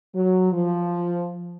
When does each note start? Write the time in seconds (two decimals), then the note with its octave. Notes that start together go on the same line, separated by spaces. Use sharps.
0.14 F#3
0.53 F3